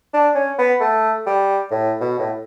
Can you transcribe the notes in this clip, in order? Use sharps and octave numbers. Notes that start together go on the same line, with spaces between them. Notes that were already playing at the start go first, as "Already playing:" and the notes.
D4
C#4
B3
A3
G3
A2
B2
A2